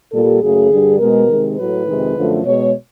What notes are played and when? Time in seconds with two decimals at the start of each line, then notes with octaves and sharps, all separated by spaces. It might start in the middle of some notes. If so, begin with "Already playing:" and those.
0.12 A#2 G3 A4
0.41 F#2 C#3 F#3 A3 G#4
0.70 G2 D3 G3
0.99 B2 G#3 A#4
1.28 C3 D#3 G#3
1.57 A2 F#3 A3 B4
1.86 F2 C3 D#3 G#3
2.15 F#2 D3 F3 A3
2.44 B2 G#3 C#5